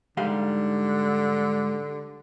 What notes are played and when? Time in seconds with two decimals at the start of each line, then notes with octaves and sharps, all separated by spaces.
0.17 G#2 D3 G3 F5